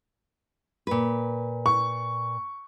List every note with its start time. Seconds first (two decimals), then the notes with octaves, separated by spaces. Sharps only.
0.87 A#2 B4
1.66 C#6